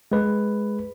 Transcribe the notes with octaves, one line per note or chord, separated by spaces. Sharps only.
G#3 B4